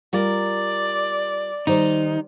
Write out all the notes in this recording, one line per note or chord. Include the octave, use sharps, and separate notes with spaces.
G3 F4 A#4 D5
D#3 G3 D#4 C5